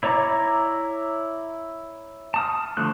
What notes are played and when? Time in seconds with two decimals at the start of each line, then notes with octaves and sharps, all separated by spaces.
0.03 E4 C#5 D5 A#5
2.34 A5 D#6 F6
2.77 D3 F3 A3 F#6